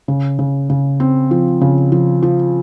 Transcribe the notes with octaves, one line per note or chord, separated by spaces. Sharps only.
C#3
C#3
C#3
C4
F3
C#3
F3
F3